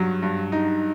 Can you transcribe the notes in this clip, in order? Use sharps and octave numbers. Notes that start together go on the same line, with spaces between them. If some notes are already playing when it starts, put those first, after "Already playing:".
Already playing: G2 F#3
G2
D#4